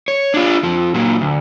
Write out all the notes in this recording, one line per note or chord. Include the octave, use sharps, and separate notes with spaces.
C#5
D4 F4
F2 F3
A#2 F#3
D2